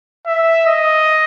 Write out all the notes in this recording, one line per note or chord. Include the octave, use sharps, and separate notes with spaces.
E5
D#5